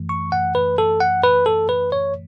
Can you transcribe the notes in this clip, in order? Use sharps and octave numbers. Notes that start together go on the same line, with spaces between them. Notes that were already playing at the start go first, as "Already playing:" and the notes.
Already playing: F#2 E3 A3
C#6
F#5
B4
A4
F#5
B4
A4
B4
C#5